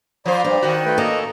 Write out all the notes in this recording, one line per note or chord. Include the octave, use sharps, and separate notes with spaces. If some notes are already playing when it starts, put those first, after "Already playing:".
F3 C5 D5 A#5 B5
G2 C5
D#3 F#4
A3 B4 G5
A#3 C#4 A4 D#5 A#5